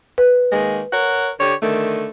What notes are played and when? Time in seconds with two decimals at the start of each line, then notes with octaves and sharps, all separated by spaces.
0.18 B4
0.51 D#3 G#3 A#3
0.93 A#4 C#5 F#5
1.39 D3 G4 C#5
1.62 D3 D#3 A3